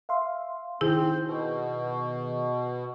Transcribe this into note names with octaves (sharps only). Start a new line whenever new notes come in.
E5 F5 C6
D#3 C4 E4 G#4 G6
B2